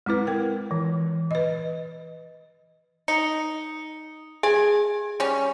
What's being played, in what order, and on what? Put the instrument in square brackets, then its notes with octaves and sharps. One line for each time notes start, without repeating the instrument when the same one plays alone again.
[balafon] G#3 C4 E4 B4
A#4 G5
E3
B4 D#5
[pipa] D#4 [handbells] C#7
[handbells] G#4 [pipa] G#5
[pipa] G3 C#4